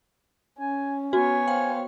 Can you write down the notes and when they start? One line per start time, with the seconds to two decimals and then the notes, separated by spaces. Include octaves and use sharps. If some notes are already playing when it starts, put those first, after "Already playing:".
0.59 C#4 G#5
1.13 B3 F#4 C#5 G#5
1.48 C5 F5 G5